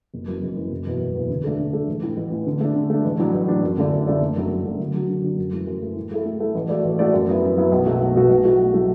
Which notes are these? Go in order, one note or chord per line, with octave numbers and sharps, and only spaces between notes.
F#1
F#2 E3
F#1
F#2 E3
F#1
E2 B2 B3 E4
F#1
E2 B2 B3 E4
D3
A3 D4 A4
D3
A3 D4 A4
A1
A2 E3
A1
A2 E3
D3
A3 D4
D3
A3 D4
A1
A2 F#3 D4
A1
A2 F#3 D4
F#2
D3 A3 E4 D5
F#2
D3 A3 E4 D5
F#1
F#2 F#3 A3 D4
F#1
F#2 F#3 A3 D4
D3
F#3 D4 F#4
D3
F#3 D4 F#4
F#2
E3 A3
F#2
E3 A3
A2
A3 E4 A4
A2
A3 E4 A4
A1
A2 A3 F#4 D5
A1
A2 A3 F#4 D5
F#2
F#3 B3 E4
F#2
F#3 B3 E4
B1
B2 F#3 A3 F#4
B1
B2 F#3 A3 F#4
B1
A2 F#3 A3 F#4
B1
A2 F#3 A3 F#4